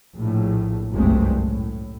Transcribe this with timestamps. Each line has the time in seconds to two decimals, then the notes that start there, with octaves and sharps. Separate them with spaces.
0.14 A#1 A2
0.91 F#1 C2 G2 G#3 A3 C4
1.40 A2